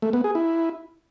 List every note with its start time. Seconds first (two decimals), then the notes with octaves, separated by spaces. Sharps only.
0.02 A3
0.13 B3
0.24 G#4
0.35 E4